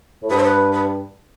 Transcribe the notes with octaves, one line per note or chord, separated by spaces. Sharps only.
A2
G2 B4
C5
B4
B4